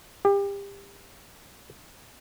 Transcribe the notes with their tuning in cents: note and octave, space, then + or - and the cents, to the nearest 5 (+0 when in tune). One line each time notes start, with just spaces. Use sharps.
G4 +30